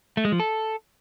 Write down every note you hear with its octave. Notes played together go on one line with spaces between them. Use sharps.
A3
G#3
F3
A4